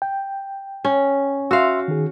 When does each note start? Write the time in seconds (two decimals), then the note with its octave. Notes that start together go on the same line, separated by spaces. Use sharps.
0.02 G5
0.85 C#4
1.51 F#4 E5 F5 C6 E6
1.88 D#3 G#4